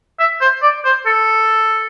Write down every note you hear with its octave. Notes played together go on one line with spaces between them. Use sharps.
E5
C5
D5
C5
A4